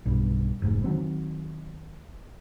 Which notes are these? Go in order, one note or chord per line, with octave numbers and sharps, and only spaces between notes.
B1 G2
F1 G#2
D#3 F3 F#3 C4